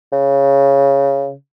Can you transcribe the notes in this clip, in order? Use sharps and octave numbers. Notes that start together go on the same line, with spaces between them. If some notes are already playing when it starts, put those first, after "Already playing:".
C#3